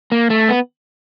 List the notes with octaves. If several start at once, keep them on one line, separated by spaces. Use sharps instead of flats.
A#3
A3
B3